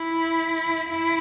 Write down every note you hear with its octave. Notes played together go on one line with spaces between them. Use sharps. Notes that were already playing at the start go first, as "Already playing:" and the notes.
Already playing: E4
E4